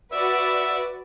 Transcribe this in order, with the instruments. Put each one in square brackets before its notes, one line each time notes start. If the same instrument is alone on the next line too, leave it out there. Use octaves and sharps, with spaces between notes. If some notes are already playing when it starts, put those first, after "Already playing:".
[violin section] F#4 B4 D5 [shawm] E5